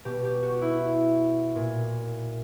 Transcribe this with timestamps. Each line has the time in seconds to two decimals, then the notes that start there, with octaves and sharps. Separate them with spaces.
0.05 B2 G4
0.25 G4
0.43 F#4
0.62 E4
1.55 A#2